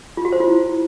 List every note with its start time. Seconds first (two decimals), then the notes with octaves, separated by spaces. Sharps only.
0.17 F4
0.25 F#4
0.32 C5
0.40 F4
0.48 E4